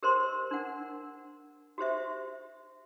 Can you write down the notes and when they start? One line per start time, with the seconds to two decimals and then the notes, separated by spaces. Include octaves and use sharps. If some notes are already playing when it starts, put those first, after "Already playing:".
0.03 G4 A#4 C5 D#5 C6
0.51 D4 A#4 F#5
1.78 F#4 G4 C5 E5